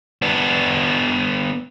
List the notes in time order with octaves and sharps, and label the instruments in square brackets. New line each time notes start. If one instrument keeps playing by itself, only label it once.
[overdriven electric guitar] B3 D4